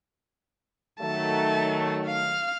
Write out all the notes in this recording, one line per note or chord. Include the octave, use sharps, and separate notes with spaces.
D#3 F#3 A3 A5
F5 F6